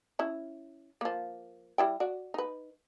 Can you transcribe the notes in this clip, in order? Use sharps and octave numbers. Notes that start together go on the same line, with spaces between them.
C#4 E4
F3 A#3
G3 E4 G5
F#4 D5
D#4 B4